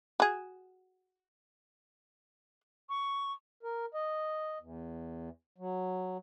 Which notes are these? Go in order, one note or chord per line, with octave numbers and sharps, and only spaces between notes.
F#4 G#4
C#6
A#4
D#5
E2
F#3